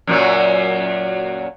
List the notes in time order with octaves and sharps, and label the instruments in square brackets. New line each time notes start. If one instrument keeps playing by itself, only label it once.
[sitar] F#2 A#2 F#3